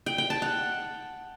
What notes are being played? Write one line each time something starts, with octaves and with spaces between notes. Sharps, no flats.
G5
G5
A5
F#5